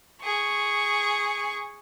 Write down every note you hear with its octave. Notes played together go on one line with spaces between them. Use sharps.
G#4 C#6